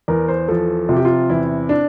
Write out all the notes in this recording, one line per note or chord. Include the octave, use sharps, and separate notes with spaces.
E2 A#4
C5
F3 A4
C3 F4
G4
F4
E2 E4
D4